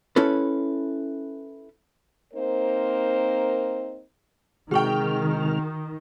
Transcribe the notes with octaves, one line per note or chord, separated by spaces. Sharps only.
C#4 E4 A4 B4
A#3 C4 D#4 A#4 C5
C3 D#3 G#3 F#4 G#4 G5 C#6 F6